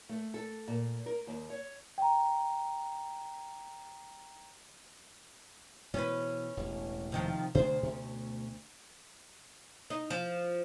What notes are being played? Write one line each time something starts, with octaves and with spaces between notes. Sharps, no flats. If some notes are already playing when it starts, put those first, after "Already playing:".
A3
A4
A#2
A#4
D#2
C#5
G5 A#5
B2 E3 C#4 B4
E1 A1
C3 D#3 F3
D2 B2 D3 C5
B2 A3 C#4
D#4
F3